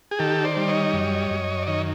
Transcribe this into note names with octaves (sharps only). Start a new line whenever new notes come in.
G#4
D#3 G4 A4
C5 D5
G3
C#5 D#5
F#2
F#2
D5
D#3 C#5 D#5